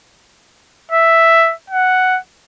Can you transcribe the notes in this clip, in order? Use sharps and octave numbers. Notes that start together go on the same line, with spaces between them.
E5
F#5